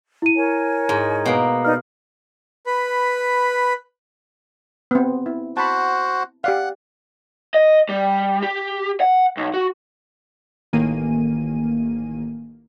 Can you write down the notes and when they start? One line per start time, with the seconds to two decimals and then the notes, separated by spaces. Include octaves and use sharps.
0.22 E4 D#7
0.36 A#4 C#5 G#5
0.89 G#2
1.26 B2 A#3
1.65 D#4 B4 D5 F6
2.66 B4 B5
4.91 B3 C4
5.26 E4
5.57 F#4 C5 F#5 A5 B5
6.44 G4 D5 F5 F#5
7.54 D#5
7.89 G3
8.42 G4
9.00 F#5
9.37 B1
9.54 F#4
10.73 A1 D#3 A#3 G#5 D#7